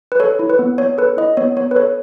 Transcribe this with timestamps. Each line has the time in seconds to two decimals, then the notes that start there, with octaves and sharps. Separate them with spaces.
0.12 B4
0.20 A4 C#5
0.39 E4
0.50 B4
0.59 B3
0.78 B3 C#5
0.98 A4 B4
1.17 E4 D#5
1.37 B3 C#5
1.56 B3 C#5
1.71 B4
1.75 A4 C#5